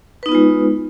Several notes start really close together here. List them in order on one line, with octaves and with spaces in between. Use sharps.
B4 D#4 B3 F4 G#3